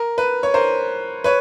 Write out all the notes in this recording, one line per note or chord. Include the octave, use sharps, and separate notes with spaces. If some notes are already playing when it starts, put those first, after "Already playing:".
Already playing: A#4
B4
C#5
A#4 C5
B4 C#5